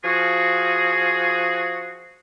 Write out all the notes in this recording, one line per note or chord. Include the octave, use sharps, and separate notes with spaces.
F3 F#4 G#4